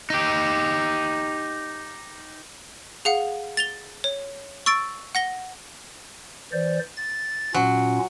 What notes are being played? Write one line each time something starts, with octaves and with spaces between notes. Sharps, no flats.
D#4 G4
G#4 F5 F#5
A6 F7 G7
C#5
C#6 E6 A6 D7
F#5 A#6 G7
E3 C5 D5
A6
A#2 F#3 C#4 F4